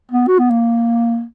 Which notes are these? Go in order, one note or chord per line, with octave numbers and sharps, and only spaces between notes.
B3
F#4
B3
A#3